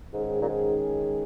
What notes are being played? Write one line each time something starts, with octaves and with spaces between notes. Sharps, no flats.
G#2 D#3 G#3 C#4 G#4 C#5
A#2
G#2